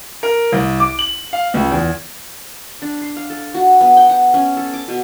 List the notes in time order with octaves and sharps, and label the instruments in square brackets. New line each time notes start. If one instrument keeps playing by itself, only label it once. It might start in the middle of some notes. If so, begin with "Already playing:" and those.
[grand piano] A#4
C2
D6
F#7
F5
C#2
E2
[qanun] D4
C6
F5
A4
F#4
B3
G5
F#5
C#4
A4
D6
B2